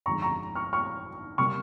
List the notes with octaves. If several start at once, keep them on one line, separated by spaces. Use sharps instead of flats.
G1 F2 D#3 G#3 A#5 C#6
A#5 C#6
C#6 F6
C#6 F6
C3 G3 A#3 C#6 F6